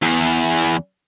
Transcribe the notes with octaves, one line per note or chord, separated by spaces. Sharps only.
E2 E3